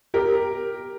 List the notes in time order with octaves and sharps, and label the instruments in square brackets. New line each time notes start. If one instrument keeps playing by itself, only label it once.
[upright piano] G4 A#4